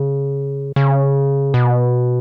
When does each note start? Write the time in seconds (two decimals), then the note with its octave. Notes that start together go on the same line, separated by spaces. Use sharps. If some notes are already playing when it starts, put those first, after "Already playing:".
Already playing: C#3
0.76 C#3
1.54 B2